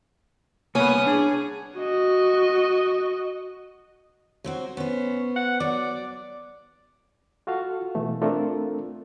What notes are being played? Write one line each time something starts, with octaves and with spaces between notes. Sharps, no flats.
C2 A#3 B3 C#4 B5 D#6
D4 G#4
F#4 D#5
F#3 C4 F#4
B3 C#4 C5
F#5
F#3 D5
F4 F#4 A4 F5
B2 E3 A3
A3 C4 D4 F4 A4 A#4